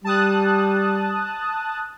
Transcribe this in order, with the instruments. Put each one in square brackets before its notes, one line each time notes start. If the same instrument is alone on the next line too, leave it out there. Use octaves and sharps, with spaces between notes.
[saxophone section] G3 [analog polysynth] A5 D#6 F#6